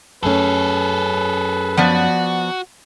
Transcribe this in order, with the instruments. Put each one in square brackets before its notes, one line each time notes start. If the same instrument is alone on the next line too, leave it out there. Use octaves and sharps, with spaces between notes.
[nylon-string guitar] F#2 A3 C#4 [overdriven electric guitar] G#4 A4 [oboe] B4
[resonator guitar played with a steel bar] F3 B3 D5 [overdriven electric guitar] F#4